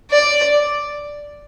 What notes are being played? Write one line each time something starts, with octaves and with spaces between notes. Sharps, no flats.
D5